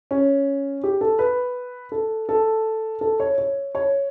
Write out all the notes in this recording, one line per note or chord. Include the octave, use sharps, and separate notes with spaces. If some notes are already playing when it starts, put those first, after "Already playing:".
C#4
G4
A4
B4
A4
A4
A4
C#5
C#5
C#5